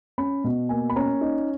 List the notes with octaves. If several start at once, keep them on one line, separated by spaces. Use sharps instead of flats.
C#4 B5
B2
A#3 G#5
B5
C#4 A#5
D#4